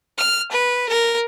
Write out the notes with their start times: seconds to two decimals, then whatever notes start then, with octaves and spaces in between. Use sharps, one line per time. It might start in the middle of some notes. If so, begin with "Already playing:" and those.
0.18 F6
0.52 B4
0.89 A#4